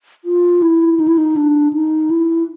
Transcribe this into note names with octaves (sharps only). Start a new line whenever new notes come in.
F4
E4
D#4
E4
D#4
D4
D#4
E4